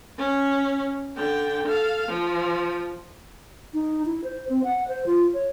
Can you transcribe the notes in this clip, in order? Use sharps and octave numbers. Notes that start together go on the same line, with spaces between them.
C#4
D3 G5
A4 F5
F3
D#4
E4
C5
C4
F#5
C5
F4
C#5